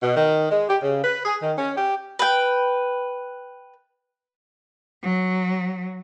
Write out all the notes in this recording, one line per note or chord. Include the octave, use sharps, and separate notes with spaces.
B2
D#3
G#3
G4
C#3
B4
G#4
D#3
C#4
G4
B4 G5
F#3